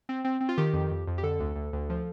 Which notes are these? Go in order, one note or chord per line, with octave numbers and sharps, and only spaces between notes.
C4
C4
C4
F4
D#3 G4
F2
F2
F2
G4
D3 A4
D2
D2
D2
F3